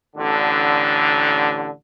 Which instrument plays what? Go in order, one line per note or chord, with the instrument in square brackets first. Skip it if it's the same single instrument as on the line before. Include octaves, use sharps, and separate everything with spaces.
[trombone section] A1 D3